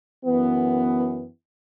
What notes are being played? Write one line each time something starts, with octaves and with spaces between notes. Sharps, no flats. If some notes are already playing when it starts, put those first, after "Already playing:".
F#2 E3 B3